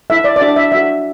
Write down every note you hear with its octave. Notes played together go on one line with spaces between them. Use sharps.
E4 A4 E5
D5
D5
D4 F#4 A4 E5
E5
D4 F#4 A4 E5